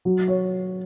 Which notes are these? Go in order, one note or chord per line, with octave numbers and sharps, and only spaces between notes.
F#3
C#5